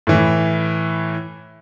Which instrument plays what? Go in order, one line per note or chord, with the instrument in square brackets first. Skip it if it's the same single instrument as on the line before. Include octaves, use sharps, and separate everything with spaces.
[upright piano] A2 E3